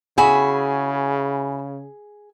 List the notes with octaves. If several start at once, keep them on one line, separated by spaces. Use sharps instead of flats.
C#3 E4 F#4 G#4 G#5 B5